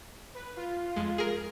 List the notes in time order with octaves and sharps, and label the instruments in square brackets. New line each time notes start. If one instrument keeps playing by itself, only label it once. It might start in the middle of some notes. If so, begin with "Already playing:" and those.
[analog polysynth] B4
F4
[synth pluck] F2 G#3
G#4 A#4